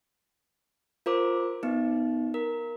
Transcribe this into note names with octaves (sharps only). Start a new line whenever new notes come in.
F4 A#4 C5 D6
B3 D#4
A#4